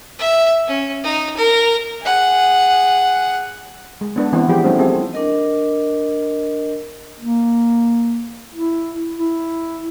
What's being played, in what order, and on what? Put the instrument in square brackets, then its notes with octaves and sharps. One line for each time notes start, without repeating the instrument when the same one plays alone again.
[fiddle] E5
C#4
D#4
A#4
G#4 F#5
[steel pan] G#3
B3 D4 B4
E3 B3 C4
F3 G4 G#4
G3 A3 C#4 D4 E4 C5
C4 F4 G#4 A4
[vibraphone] D4 A#4 D#5
[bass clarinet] A#3
E4
E4